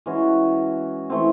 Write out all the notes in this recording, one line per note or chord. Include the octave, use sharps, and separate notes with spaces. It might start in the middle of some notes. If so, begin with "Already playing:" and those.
E3 G#3 C#4 F#4
E3 A3 C4